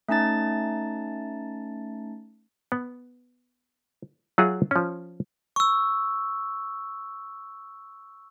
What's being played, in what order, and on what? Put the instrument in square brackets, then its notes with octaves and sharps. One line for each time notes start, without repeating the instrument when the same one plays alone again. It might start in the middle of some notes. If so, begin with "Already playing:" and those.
[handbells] A3 C#4 D#4 A5 A6
[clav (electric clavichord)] B3
F#3 F4 F#4 G#4 E5
F3 C#4
[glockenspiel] C#6 E6